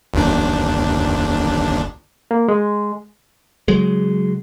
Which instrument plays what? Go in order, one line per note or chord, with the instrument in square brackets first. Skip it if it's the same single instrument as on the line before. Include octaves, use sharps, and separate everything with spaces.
[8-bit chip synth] G1 D#2 D4
[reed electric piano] A#3
G#3
[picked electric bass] C#3 F#3 G#3